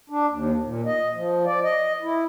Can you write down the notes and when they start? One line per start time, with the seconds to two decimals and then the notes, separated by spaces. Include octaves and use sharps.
0.10 D4
0.30 D#2
0.64 A#2
0.86 D#5
1.14 F3
1.45 D5
1.64 D#5
2.02 E4